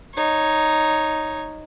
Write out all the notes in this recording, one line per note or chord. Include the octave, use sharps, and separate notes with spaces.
D#4 C#5